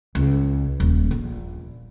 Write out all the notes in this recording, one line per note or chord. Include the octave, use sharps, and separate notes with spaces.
C#2
D#1
A#1